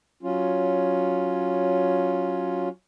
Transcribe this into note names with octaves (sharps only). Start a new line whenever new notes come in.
F#3 C#4 F4